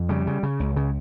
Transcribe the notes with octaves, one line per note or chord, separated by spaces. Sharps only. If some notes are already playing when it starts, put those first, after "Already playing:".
Already playing: F2
C#3 G3
C#3
C#3
C#2
C#3